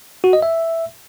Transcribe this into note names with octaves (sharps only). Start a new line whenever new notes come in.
F#4
D#5
E5